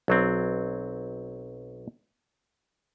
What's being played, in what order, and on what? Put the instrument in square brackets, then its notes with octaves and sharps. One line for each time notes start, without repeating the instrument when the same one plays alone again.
[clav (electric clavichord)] B1 F#3 C4